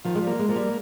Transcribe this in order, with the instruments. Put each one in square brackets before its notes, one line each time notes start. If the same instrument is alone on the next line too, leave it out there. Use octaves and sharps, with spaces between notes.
[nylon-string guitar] D#3 [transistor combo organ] F3
[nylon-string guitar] G#3
G3
[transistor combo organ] A#3
[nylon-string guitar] G#3
[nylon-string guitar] F3 [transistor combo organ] A#3
[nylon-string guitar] G3